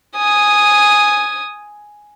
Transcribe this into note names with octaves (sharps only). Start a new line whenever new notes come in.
G#5 D#6